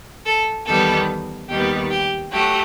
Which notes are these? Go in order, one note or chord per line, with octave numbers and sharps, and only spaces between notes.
A4
E2 D#3 G3 B3 A4
D#2 D#3 G3 B3 G4
G4
F#3 A3 G4